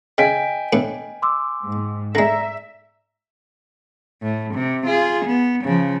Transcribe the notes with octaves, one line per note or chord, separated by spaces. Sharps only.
C#3 D#5 G5 G#5 B6 D7
A2 B3 D4
C6 D6 E6
G#2
D3 G#3 D5 E5 A#5 A#6
A2
C3
F4 G#4
B3
C#3 F3